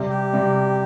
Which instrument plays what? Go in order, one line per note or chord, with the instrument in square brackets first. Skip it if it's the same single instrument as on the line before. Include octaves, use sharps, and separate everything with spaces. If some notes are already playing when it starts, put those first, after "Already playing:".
Already playing: [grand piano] C3 G3 C4
[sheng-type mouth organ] G4
[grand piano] C3 G3 C4